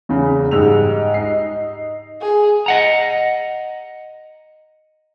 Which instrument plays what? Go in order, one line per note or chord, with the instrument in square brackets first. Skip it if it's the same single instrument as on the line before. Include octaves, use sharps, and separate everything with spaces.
[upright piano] E2 C#3
G#2 G3 G#3 E6 F7
D#4 C7
[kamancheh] G#4
[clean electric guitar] D#5 F#5 A#5